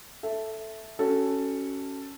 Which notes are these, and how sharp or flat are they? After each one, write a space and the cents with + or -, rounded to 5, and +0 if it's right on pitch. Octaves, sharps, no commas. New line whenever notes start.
A4 +0 E5 +0
C#4 +0 F#4 +25 A4 +5